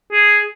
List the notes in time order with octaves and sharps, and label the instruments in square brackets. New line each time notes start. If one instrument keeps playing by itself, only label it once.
[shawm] G#4